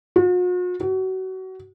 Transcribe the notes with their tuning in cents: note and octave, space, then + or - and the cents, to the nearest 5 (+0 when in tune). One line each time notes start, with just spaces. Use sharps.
F#4 -45
F#4 +30